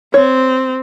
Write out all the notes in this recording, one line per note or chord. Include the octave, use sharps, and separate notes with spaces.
C4 C#5